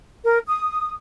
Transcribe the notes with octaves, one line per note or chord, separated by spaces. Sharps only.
A#4
D#6